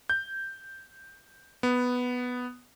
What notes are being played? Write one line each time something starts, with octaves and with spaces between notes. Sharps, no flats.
G6
B3